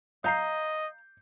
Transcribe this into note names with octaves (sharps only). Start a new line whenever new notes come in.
D#5 F5 A#5 G6 C7